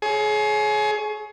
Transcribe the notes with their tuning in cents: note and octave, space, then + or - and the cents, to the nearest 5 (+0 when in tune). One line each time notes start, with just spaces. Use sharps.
G#4 +30 C#5 +0